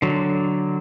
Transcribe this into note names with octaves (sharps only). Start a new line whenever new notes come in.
D3 F#3